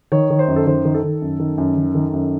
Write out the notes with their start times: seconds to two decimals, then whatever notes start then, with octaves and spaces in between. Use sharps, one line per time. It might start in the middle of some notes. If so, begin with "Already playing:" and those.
0.12 D#3 C#5
0.30 D#3
0.39 C5
0.48 F#2
0.56 A4
0.67 D#3 C5
0.85 D#3
0.94 A4
1.03 D#3
1.22 F#2
1.40 D#3
1.58 F#2
1.77 D#3
1.95 D#3
2.13 F#2